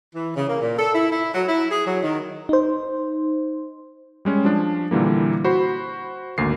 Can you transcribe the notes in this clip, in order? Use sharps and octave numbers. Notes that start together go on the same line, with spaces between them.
E3
C#3
A#3
A#2
A4
E4
E4
F#3
E4
G#4
F#3
D#3
D#4 C5
G3 G#3 C#4
F3 D4
A#2 D3 E3 G3 A#3
F#4 C5 B5
G#1 D2 A#3 C7